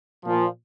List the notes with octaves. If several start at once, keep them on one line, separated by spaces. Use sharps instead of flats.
A#2 F3